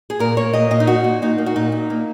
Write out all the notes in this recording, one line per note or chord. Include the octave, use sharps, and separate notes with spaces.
G#4
A#2 A#4
A#3 C#5
A#2 D#5
A#2 D#5
D#4
A#3 F#4
A#2
A#2 D#4
A#3
F#4
A#2 D#4
A#2
A#3